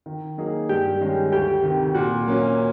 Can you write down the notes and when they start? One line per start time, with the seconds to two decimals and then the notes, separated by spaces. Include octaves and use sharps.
0.06 D#3
0.37 F#3 A#3 D#4 G#4
0.69 G2 G4
1.01 D#3 G#3 C#4
1.32 D2 G4
1.63 C3 D#3
1.95 A#2 F#4
2.27 F#3 A#3 C#4